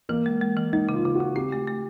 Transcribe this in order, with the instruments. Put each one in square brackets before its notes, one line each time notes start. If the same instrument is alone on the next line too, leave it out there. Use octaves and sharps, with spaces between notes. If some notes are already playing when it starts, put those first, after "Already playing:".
[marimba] E3 [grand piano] A#3
[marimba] G#3
G#3
E3
[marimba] G#3 [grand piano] D#4
[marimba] C#3
[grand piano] F4
[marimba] C#3
[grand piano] F#4
[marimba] C#3
[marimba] C4 [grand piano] G4
[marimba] A3
A3